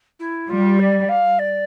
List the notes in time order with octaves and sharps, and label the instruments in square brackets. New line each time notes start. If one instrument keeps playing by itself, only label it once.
[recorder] E4
[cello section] G3 [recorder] F4
[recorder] D5
F5
D5